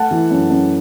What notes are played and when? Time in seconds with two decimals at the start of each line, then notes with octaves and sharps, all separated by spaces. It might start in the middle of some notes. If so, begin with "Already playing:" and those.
Already playing: A3 F#5 A5
0.11 E3
0.31 F#2
0.50 F#2